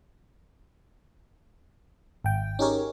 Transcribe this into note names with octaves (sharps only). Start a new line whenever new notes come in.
G#1 G5
C#4 D#4 G4 G#4 A#4 C#5